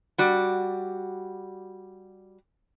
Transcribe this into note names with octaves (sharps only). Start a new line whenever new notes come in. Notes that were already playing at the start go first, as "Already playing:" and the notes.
G3 F#4 D5